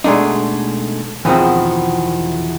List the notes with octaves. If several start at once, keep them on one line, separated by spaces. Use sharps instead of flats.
B2 G#3 A3 D4 D#4
E2 B2 D#3 F3 C4